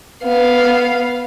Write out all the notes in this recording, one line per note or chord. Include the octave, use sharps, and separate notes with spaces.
B3 F5